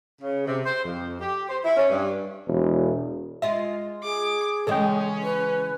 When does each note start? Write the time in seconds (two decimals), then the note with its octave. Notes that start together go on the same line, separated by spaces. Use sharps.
0.22 C#3
0.47 C3
0.65 C5
0.84 F2
1.21 G4
1.49 C5
1.64 E4
1.77 C#4
1.90 G2
2.47 E1
3.42 G#3 F4 D#5 E5
4.03 G#4 D6
4.67 C#3 E3 G#3 C#4 A4 D#5 G5
5.23 B4